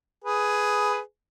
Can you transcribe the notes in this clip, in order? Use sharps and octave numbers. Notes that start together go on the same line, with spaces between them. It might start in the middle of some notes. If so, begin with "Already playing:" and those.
G#4 B4